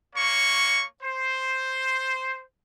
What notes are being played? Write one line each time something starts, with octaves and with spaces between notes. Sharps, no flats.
A#3 C#5 C#6
C5